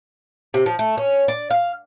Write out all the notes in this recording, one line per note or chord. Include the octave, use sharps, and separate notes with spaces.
C3
F3
A3
C#4
D5
F5